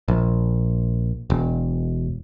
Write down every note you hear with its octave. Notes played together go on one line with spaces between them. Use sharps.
A#1
E1